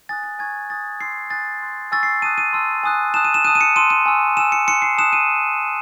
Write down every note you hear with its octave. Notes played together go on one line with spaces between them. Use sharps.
G#5 D#6 F#6 A6
A6
G#5 C#6 F#6 G#6
G#5 D#6 F#6 A6
C6 E6 C7
G#5 D#6 F#6 A6
C6 F#6
G#5 C#6 E6 A6
C7
A5 D#6 F#6 D#7
D#7
A5 C6 E6
G#5 D#6 F#6
A5 D#6 F#6 E7
D#7
E7
A5 D#6 F#6 D#7
D#7
C#7
A5 C6 E6 D#7
D#7
G#5 C#6 E6
G#5 C6 E6 E7
C#7
C6 F#6 C#7
C7
A5 D#6 F#6 E7
D#7